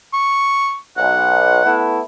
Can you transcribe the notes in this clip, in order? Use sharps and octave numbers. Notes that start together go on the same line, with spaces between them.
C#6
B1 F#5
A3 B3 E4